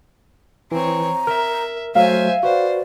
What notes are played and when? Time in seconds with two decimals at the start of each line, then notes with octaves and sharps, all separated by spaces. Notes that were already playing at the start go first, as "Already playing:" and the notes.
0.72 E3 C4 C#5 A#5
1.27 A#4 E5
1.95 F#3 A3 C5 E5 F5 G#5
2.43 F#4 B4 C5 D5